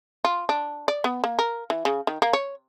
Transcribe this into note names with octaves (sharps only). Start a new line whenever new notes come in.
F4
D4
D5
B3
A#3
A#4
E3
C#3
D#3
A#3
C#5